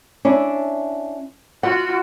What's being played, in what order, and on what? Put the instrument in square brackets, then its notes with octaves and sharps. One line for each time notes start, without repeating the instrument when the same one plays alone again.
[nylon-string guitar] C#4 D4 E4
[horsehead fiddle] F4 F#4 [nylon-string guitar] F#5